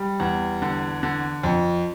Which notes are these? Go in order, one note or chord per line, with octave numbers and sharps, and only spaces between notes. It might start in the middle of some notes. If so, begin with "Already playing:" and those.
Already playing: G3
E2
D3
D3
F2